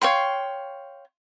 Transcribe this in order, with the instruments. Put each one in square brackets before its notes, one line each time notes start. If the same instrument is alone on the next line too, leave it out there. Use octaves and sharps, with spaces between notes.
[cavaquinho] C#5 F5 G5 C6